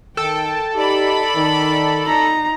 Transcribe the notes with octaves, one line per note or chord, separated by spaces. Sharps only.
D#3 A4 G5
D#4 G4 D5 B5
D#3
D#4 A#5